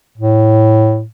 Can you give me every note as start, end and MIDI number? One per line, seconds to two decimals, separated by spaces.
0.18 1.04 45